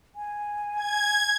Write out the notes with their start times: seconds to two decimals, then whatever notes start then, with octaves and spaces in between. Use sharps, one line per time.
0.16 G#5
0.76 G#6